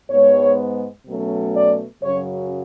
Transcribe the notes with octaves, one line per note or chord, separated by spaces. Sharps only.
G#2 G#3 B3 C#5
B2 F#3 A3 C#4
D5
F#2 C#3 F#3 C#5